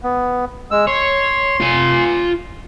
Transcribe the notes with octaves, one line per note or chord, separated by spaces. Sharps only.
B3
G#3 E6
C#5 C6
F4 G#5